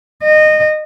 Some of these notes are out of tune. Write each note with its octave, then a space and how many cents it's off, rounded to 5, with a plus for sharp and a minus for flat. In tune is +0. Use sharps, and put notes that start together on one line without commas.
D#5 -20